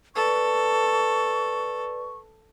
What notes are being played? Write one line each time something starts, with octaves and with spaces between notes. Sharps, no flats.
A4 B4 D5 C#6